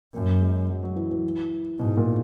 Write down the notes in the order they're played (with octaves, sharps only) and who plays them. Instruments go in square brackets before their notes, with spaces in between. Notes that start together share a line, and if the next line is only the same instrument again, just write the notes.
[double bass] F#2 [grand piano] A#3
[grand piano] G#3
F#3
F#3
E3
E3
[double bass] G#2 [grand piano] B2
[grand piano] A#2